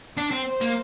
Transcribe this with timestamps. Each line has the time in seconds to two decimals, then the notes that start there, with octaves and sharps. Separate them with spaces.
0.17 D4
0.31 C4
0.46 C5
0.61 A#3